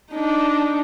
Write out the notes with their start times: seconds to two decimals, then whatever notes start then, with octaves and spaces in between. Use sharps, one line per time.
0.12 D4 D#4